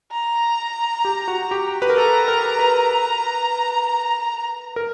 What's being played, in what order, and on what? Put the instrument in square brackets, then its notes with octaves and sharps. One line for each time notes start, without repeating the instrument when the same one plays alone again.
[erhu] A#5
[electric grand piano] G4
F#4
G4
B4
A#4
[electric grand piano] A4 [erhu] A#5
[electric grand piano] A#4
B4
A#4